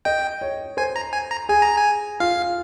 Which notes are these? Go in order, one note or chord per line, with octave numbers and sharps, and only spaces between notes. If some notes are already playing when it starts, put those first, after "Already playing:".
D#5 G5
C#5
C5 G#5
A#5
G#5
A#5
G#4 G#5
A#5
G#5
F4 F5